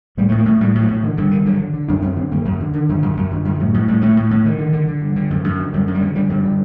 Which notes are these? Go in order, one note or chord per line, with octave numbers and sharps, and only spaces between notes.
A2 G3
A3
A2
A#3
A2 A3
A2 G3
A2
F#3
A2
D3 D#3
G2 D3
D3 D#3
D3 F#3
D3
D3
F#2 D4
F#2 C4
D3 C4
F#2 A#3
F#2
D3
D3 D#3
F#2
F#2
F#2
D3
F#2
A2 F#3
A2 F#3
A2 G3
A2 A3
A2
A2
D3 D#3
D3
D3
D3
G2
D3
F#2
F#2
D3
F#2 G3
F#2
G3
D3
D3 G3
G2 F#3
G3
D3